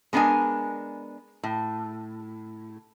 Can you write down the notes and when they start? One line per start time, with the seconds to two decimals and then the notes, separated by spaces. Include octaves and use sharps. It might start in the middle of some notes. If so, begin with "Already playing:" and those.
0.13 G#3 B3 D4 A#4 G#5
1.43 A2